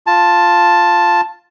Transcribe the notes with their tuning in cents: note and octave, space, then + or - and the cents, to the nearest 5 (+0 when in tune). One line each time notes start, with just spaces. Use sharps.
F4 +0 A5 +0